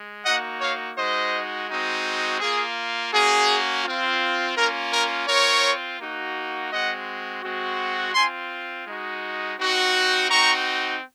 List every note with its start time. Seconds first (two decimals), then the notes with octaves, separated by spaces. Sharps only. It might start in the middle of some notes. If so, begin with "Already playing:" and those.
Already playing: G#3
0.25 A#3 D#4 F#4 D#5 F#5
0.61 C#5 F5
0.97 G#3 D#4 F#4 C5 D#5
1.69 G#3 C4 D#4 F#4
2.41 A#3 F4 G#4
3.12 A#3 C#4 F#4 G#4
3.84 C4 F4
4.56 A#3 C#4 F4 A#4
4.92 A#4
5.27 C4 F4 A#4 C#5
5.99 A#3 D#4 F#4
6.71 G#3 C4 F#4 D#5 F#5
7.42 G#3 C4 F#4
8.14 C4 F4 G#5 C6
8.86 G#3 D#4 F#4
9.58 C4 D#4 F#4
10.29 C4 D#4 F#4 A#5 C#6